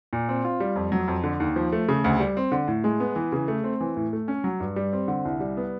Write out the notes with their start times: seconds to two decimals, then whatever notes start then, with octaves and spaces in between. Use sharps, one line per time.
0.13 A#2
0.29 C4
0.45 F4
0.60 G3
0.76 F2
0.92 F#3
1.08 F2
1.24 D3
1.40 D#2
1.56 F3
1.72 A3
1.88 C#3
2.04 D2
2.20 G3
2.37 C4
2.52 D3
2.68 A2
2.84 G#3
3.00 B3
3.16 E3
3.32 C#3
3.48 A3
3.64 C4
3.81 E3
3.96 A2
4.13 A3
4.28 C#4
4.44 F#3
4.60 G2
4.76 G3
4.93 C4
5.08 D3
5.25 C2
5.40 G3
5.57 B3